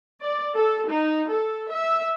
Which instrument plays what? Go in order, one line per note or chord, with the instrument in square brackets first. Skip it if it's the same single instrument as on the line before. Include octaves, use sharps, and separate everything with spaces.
[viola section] D5
A4
D#4
A4
E5